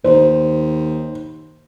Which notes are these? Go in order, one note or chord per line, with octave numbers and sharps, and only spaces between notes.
D#2 C5